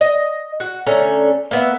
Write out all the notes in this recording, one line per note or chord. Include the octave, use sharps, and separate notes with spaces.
D#5
F#4
D3 A3 C#4 A#5
A#3 B3 E5